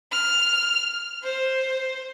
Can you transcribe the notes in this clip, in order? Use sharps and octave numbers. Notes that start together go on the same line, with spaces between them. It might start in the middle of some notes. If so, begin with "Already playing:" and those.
F6
C5